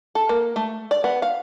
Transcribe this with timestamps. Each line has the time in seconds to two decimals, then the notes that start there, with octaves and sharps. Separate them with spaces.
0.15 A4
0.29 A#3
0.56 A3
0.91 D5
1.04 B3
1.22 F5